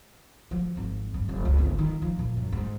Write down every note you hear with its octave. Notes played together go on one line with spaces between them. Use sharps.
F3
G#1
G2
F1
C#2
G1
D#3
F3
A#2
F#2
G#2